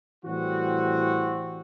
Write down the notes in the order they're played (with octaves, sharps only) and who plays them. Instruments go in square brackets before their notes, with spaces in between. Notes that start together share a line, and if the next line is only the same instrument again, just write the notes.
[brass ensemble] A2 E3 G3 C4 F#4